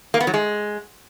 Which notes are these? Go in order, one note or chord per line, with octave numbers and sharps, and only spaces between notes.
A#3
B3
F#3
G#3